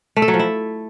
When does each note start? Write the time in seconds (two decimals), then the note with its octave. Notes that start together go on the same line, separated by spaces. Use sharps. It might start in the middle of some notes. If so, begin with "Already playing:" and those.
0.17 A3
0.22 A4
0.28 F#3
0.34 F3
0.39 E4